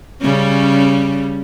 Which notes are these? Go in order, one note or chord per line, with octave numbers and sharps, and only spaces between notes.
C#3 G3 C#4